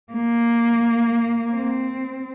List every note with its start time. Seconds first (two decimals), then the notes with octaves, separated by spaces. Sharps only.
0.12 A#3
1.53 C4